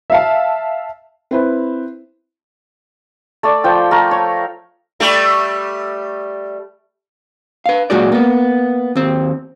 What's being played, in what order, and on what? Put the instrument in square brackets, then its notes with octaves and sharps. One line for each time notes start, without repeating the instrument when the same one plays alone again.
[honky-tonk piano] E5 F5 A5
[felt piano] C4 E4 B4
[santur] A3 D5
F3 G5
A3 A#4
C#5
[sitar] G3 A3 G4
[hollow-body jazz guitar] B4 F5
F#2 A#2 G#3 F#4 D5
A#3 B3
D#2 C4